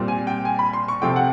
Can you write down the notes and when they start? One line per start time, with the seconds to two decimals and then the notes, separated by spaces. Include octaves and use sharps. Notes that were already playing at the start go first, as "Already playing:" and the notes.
Already playing: A#2 G3 C4
0.08 G#5
0.27 G5
0.45 G#5
0.59 B5
0.73 C6
0.88 C#6
1.02 C3 F3 A3 C4 G5
1.16 F#5